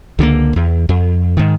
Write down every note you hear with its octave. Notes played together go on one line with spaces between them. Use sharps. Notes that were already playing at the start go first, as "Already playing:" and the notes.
C#2 D3 D#3 A#3
E2
F2
G#2 D#3